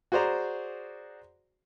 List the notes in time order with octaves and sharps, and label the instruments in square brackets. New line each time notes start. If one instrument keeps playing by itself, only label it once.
[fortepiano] F#4 G#4 C5 D5 A#5